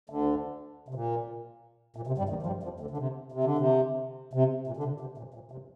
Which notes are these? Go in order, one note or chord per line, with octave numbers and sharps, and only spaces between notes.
D2 D3
C3
A#2
A#2
C3
G2 G3
D#2 D#3
F3
G2 G3
F2 F3
D2 D3
D3
C3
C3
D3
C3
C3
A#2
D3
C3
C3
A#2
A#2
C3